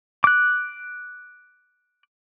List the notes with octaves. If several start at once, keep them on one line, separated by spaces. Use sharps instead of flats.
D6 F#6